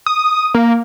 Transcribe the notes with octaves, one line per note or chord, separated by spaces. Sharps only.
D#6
A#3